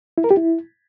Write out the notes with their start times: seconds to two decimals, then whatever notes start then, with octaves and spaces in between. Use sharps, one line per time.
0.18 E4
0.24 A#4
0.31 G4
0.37 E4